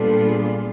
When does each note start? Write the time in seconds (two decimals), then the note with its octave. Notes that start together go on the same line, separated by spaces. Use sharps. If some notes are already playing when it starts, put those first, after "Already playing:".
Already playing: A#2 G3 B3 D4 F4 A4
0.29 G#4